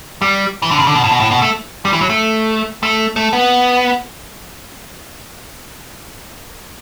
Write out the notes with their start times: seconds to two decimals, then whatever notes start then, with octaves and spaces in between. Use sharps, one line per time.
0.22 G3
0.62 E3
0.71 D3
0.79 C#3
0.87 D3
0.95 B2
1.04 A2
1.12 B2
1.20 A2
1.31 B2
1.42 A3
1.85 G3
1.93 E3
2.01 F#3
2.10 A3
2.83 A3
3.16 A3
3.33 B3